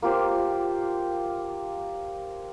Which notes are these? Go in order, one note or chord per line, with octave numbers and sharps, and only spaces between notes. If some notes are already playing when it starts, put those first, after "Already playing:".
A#3 F4 G4 C5